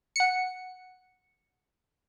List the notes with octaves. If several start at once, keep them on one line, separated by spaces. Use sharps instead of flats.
F#5 C#7